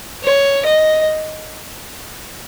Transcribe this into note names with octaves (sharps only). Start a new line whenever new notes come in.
C#5
D#5